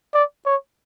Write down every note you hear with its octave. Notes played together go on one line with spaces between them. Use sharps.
D5
C#5